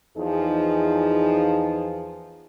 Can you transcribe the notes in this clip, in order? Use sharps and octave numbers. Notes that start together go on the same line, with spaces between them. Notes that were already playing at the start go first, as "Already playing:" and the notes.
E2 F3 D#4 G#4